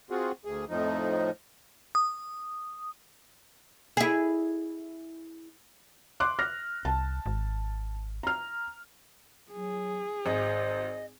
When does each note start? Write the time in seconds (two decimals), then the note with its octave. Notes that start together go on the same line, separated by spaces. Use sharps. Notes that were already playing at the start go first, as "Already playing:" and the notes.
0.10 C4 F4 F#4 G#4
0.45 D2 G#4
0.69 F2 A2 F3 D#4
1.95 D#6
3.97 E4 G#4
6.20 C6 D6 F#6
6.39 F6 A#6
6.85 C2 A5
7.26 G#1
8.23 A#5 F6
9.52 F#3 G#4
10.26 G#1 C5 D#5